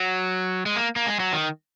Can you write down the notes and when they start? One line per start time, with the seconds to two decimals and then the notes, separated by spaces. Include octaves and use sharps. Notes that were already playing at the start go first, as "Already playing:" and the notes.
Already playing: F#3
0.66 G#3
0.76 A#3
0.96 A#3
1.07 G#3
1.20 F#3
1.33 D#3